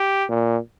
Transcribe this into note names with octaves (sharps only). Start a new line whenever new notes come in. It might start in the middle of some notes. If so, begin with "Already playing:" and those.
Already playing: G4
A#2